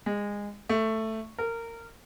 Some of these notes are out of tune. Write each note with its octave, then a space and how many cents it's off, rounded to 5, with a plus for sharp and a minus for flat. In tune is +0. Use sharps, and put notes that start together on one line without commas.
G#3 -25
A3 +5
A#4 -20